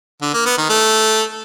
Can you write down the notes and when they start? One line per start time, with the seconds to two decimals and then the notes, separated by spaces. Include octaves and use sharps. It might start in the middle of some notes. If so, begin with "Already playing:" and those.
0.22 D3
0.34 A#3
0.46 B3
0.58 D#3
0.70 A3